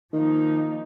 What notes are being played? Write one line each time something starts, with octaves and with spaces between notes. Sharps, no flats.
D#3 F3 A#3 D#4